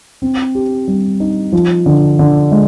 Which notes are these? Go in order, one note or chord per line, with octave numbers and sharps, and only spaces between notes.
C4
G4
G3
D#4
F3
D3
D3
G#3